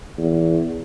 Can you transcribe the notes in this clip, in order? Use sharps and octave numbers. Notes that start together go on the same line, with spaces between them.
E2